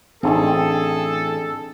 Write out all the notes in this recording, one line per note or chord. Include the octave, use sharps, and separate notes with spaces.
A1 C4 D4 D#4 G#4 A4